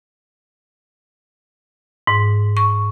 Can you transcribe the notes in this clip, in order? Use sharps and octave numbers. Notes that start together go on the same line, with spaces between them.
G#2
C#6